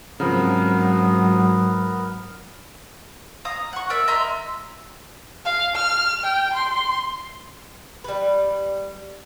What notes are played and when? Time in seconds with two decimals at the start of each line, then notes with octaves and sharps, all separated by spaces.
0.20 G#2 C#3 F3 F#3 B3 C4 A#4
3.45 F5 A#5 D#6
3.73 F#5 C#6
3.90 A#4 D5 E5
4.08 D#5 E5 A#5 C6
5.45 F5
5.75 F6
6.24 G5
6.54 C6
8.04 G3 B4